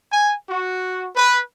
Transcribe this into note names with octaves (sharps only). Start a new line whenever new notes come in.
G#5
F#4
B4